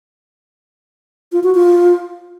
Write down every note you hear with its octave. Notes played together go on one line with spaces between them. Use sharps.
F4
F#4
F4